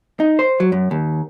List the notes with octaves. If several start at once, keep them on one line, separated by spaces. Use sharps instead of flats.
D#4
C5
F#3
F#2
D#2